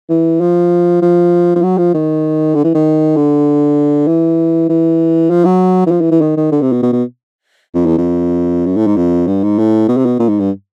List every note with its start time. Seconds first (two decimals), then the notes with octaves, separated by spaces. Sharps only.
0.09 E3
0.41 F3
1.02 F3
1.55 F3
1.62 F#3
1.78 F3
1.94 D#3
2.55 D3
2.64 E3
2.74 D#3
3.16 D3
4.07 E3
4.69 E3
5.30 F3
5.45 F#3
5.86 E3
5.91 F3
6.01 E3
6.11 E3
6.21 D#3
6.37 D#3
6.52 D3
6.62 C3
6.72 B2
6.82 B2
6.93 B2
7.74 F2
7.86 E2
7.98 F2
8.66 F#2
8.77 A2
8.87 G#2
8.97 F2
9.27 G2
9.43 G#2
9.58 A2
9.88 B2
9.97 C3
10.06 B2
10.19 A#2
10.29 G#2
10.40 G2